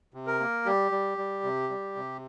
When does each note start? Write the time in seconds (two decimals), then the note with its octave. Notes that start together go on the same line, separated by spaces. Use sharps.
0.14 C3
0.27 A#4
0.40 A#3
0.66 G3 G4
0.92 G3
1.18 G3
1.44 C3
1.70 G3
1.96 C3